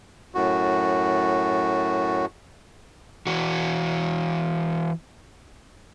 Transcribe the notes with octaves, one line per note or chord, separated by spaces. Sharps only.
F#2 A2 F#4
E3 F#4